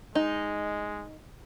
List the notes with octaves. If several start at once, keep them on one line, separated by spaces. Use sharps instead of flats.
G#3 D#4